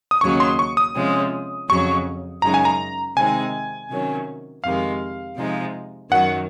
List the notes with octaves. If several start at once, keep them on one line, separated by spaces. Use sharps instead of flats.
D#6
D#2 C#3 F#3 C#4 C#6
C6
C#6
D#6
C3 F3 G#3 C#4
F2 C#3 F#3 C#4 C#6
F#2 C#3 G#3 D#4 A#5
G#5
A#5
C3 D#3 G#3 C4 D#4 G#5
C3 D#3 F#3 C#4
F2 C3 D#3 G#3 F5
C3 F3 G#3 D#4
F#2 D#3 F#3 F#5